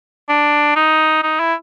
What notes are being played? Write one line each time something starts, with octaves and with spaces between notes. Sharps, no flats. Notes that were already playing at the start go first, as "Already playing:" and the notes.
D4
D#4
D#4
E4